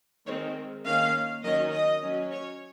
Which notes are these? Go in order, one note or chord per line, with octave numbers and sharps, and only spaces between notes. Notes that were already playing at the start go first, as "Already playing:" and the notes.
D#3 G#3 C4 C#5
D#3 A#3 C#4 F5
D#3 F#3 C#4 D#5
D#5
F#3 C#4
C#5